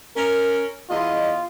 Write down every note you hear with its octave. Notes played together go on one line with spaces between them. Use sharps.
C#4 A#4
E2 F4 D#5